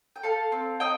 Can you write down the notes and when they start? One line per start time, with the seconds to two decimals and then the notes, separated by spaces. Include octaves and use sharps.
0.16 G5
0.23 A4 F5 A5
0.52 C4
0.80 D#4 D#5 G5